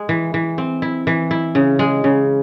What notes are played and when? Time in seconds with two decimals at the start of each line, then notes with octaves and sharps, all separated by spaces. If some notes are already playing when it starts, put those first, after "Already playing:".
Already playing: G#3
0.09 E3
0.34 E3
0.58 C4
0.82 E4
1.07 E3
1.31 E4
1.55 C#3
1.79 G#3
2.04 C#3